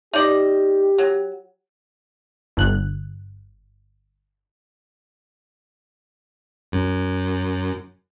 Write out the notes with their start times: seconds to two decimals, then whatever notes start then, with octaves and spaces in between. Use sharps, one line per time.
0.14 D#4 G4 D5 D#5
0.98 F#3
2.57 G1 F#6
6.72 F#2